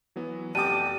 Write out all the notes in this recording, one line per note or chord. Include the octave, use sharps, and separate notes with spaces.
E3 F#3 B3
F1 G4 D5 F#5 G5 A5 D6 D#7